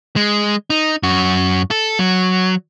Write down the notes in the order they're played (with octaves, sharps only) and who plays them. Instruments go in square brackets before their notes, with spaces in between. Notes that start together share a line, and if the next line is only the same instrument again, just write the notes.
[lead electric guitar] G#3
D#4
F#2 F#4
A4
F#3